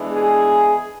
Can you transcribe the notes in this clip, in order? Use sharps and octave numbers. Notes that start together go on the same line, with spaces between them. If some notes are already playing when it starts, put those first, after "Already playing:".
Already playing: E3 G#3 B3 D4
G#4